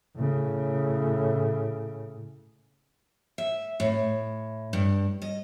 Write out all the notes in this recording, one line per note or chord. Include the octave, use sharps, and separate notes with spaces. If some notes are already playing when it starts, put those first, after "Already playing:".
A2 C#3
E5
A2
G2
D#5